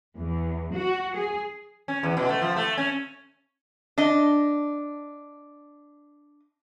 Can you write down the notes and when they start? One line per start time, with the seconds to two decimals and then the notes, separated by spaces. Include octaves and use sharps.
0.17 E2
0.74 F#4
1.16 G#4
1.88 C#4
2.03 E2
2.17 B2
2.29 A3
2.42 F3
2.56 A3
2.78 C#4
3.98 D4 D#5